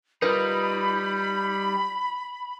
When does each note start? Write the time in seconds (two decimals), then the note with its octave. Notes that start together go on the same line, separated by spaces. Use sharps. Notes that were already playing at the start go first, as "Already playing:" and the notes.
0.22 G3 D#4 F4 A#4 B4 B5